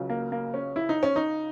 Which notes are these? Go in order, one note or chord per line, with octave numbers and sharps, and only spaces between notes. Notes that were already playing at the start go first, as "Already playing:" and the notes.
Already playing: C#2 C#3 F#3
A#3
A#3
C#4
E4
D#4
C#4
D#4